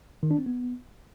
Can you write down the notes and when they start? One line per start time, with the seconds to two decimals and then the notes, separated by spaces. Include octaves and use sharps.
0.23 D#3
0.31 D4
0.38 C4
0.46 B3